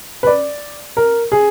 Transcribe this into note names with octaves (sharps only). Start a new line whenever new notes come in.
B4
D5
A#4
G#4